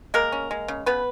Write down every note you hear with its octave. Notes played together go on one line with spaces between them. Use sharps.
G#3 A#3 A#4
C#4
G#3
C#3
C#3 B3 B4